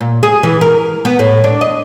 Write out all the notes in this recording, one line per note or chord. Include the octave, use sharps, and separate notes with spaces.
A#2
G#4
E3
A#4
B3
A2
D4
D#5